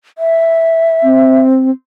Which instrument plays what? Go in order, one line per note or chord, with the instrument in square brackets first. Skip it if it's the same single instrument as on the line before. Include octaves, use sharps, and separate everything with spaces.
[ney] E5
[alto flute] C4